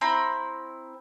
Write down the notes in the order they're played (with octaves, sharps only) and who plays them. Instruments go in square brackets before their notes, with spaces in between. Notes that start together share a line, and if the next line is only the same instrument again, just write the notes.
[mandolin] C4 E4 A#5 B5